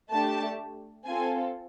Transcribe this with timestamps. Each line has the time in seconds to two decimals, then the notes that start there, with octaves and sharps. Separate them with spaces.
0.11 A3 D4 G4 A5
1.06 C4 F4 A4 G#5